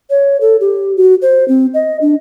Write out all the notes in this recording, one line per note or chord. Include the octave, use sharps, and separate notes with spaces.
C#5
A4
G4
F#4
C5
C4
D#5
D4